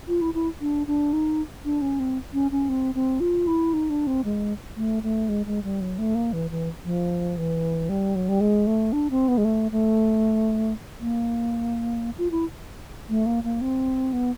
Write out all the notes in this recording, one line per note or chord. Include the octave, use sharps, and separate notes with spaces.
F4
E4
E4
D4
D4
D#4
D4
C#4
C4
C#4
C#4
C4
C4
F4
E4
D#4
D4
C4
G#3
A3
A3
G#3
G#3
G3
F#3
A3
A#3
E3
E3
F3
E3
G3
F#3
G3
G#3
A3
D4
C4
B3
G#3
A3
A3
A#3
F4
E4
A3
A#3
A#3
C4
B3